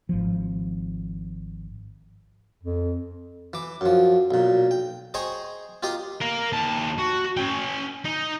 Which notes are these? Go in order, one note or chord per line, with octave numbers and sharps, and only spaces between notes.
G#1 F3
F2
E3 D6
F#2 F3
B1 A#2
G5
G#4 C5 D#5 G5 A#5 C#6
F4 G4 A#4 D#5 F5
A#4 F5
D#2 A5
F#4
C#4 G5
D#4